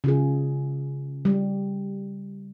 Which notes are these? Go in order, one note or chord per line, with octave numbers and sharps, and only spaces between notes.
C#3 F4 G#4
G3